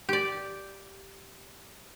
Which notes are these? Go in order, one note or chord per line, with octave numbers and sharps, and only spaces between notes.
G4 D5